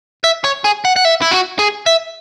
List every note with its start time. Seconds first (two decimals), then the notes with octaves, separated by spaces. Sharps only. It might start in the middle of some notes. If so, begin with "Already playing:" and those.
0.24 E5
0.45 C#5
0.65 G#4
0.85 F#5
0.96 F#5
1.05 E5
1.22 E4
1.31 F#4
1.59 G#4
1.86 E5